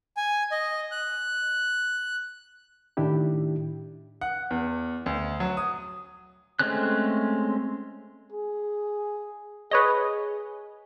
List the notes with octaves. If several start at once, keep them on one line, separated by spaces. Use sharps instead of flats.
G#5
D#5
F#6
A2 D#3 D4 E4 G4
F#5
E2
D2
F#3
D#6
G#3 A3 C4 C#4 F#6
G#4
G#4 B4 C#5 D#5